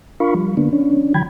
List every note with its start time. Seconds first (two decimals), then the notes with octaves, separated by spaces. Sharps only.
0.20 D4 F4 A#4 F5 B5 C#6
0.35 F3 G3
0.57 D3 A#3 B3 D4
0.73 C#4 D4
1.14 D3 E3 F#3 G5 B5 G#6